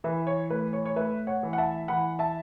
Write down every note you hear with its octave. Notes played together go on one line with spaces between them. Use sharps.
E3 B4 E5
C#5
A2 B4
C#5
C#5
A2 B4 E5
C#5 F#5
E3
F#5
E5 A5
E3 F#5 B5
E5 A5